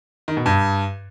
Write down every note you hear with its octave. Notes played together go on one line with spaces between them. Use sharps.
D#3
B2
G2